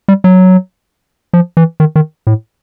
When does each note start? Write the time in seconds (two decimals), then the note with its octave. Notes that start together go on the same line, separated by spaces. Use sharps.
0.08 G3
0.24 F#3
1.33 F3
1.57 E3
1.80 D#3
1.96 D#3
2.27 A2